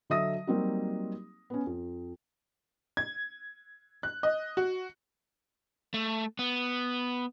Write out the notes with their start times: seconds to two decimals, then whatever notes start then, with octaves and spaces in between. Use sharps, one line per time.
0.10 D3 F#3 D#5 E5 D#6 A#6
0.47 F#3 G3 A#3 C4 D#4 F#4
1.50 B3 C#4
1.67 F2
2.97 G#6
4.03 F#6
4.23 D#5
4.57 F#4
5.94 A3
6.39 B3